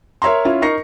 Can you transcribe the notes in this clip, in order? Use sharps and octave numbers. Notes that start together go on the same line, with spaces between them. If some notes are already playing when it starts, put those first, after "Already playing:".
A#4 C#5 E5 A#5 C6
C#4 E4 F4
D#4 A#4 C#6 A#6 C7 C#7